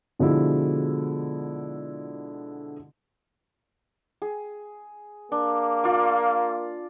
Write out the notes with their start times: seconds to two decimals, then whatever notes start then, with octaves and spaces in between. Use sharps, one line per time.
0.19 B2 D3 F3 G#3 E4 F#4
4.22 G#4
5.32 A#3 D4
5.84 F4 D5